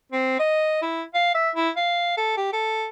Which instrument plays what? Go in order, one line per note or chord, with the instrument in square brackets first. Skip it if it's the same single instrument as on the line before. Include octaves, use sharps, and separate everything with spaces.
[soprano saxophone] C4
D#5
E4
F5
E5
E4
F5
A4
G4
A4